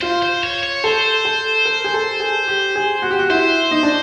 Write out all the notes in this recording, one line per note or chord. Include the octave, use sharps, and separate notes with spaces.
F4 C5
C5
C#5
C#5
A4 C5
A4
A#4
G#4
A4
G#4
G4
G#4
F#4
G4
F#4
E4 C5
D#4
D4